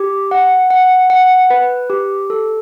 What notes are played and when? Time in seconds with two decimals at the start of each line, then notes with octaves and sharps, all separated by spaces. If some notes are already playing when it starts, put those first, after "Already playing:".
Already playing: G4
0.31 F#5
0.71 F#5
1.10 F#5
1.50 B4
1.90 G4
2.30 A4